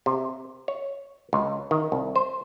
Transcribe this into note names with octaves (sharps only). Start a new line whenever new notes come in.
C3
C#5
C#2
D#3
C2
C5